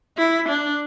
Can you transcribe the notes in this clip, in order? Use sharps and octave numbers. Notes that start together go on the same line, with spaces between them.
E4
D4